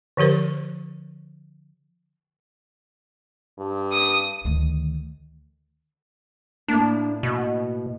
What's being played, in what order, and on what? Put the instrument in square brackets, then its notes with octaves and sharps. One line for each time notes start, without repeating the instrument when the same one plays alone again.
[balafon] D3 F3 G4 A#4 C5
[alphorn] G2
[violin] D#6
[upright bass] D2 D#3
[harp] A2 A#3 [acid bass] D4
[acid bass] B2